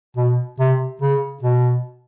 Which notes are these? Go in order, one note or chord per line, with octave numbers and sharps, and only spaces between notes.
B2
C3
C#3
B2